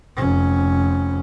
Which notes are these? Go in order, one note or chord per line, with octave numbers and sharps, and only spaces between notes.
F1 C#4